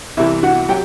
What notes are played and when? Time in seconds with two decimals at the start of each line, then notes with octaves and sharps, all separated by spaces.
0.17 C2 C3 E3 E4 E5
0.43 F#4 F#5
0.69 F#3 G4 G5